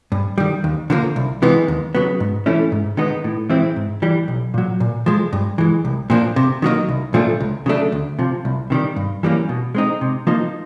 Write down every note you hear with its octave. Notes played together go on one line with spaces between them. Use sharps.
G2
D#3 G3
D#2
D3 F3 A#3
C2
C3 E3 G#3 B3
D#2
C#3 F#3 B3
G#2
E3 A3 C#4 E4
G#2
D#3 G#3 B3 D#4
A2
E3 G#3 C4 E4
G#2
E3 G3
B1
A#2 F#3
A#2
F3 G#3
G2
E3 G#3
C2
A#2 F3 A#3 D4
C3
D#3 F#3 A#3 D#4
C2
A#2 F3 A3 D4
C#2
C#3 F#3 A3 D4
D2
C3 F3
C2
C3 D#3 G3
G2
E3 G3 A#3 C#4
B2
G#3 C4 D#4
C3
F3 A#3 D#4